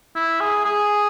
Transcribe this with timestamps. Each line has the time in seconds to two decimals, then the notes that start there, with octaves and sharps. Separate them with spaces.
0.15 E4
0.40 G#4
0.65 G#4